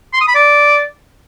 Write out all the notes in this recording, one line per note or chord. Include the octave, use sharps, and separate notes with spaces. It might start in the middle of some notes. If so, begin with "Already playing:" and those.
C6
D#6
B5
D5